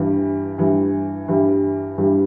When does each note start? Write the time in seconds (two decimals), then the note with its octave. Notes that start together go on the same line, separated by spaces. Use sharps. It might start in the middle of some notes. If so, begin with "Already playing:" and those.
Already playing: G2 E3 G3
0.58 G2 E3 G3
1.28 G2 E3 G3
1.98 G2 E3 G3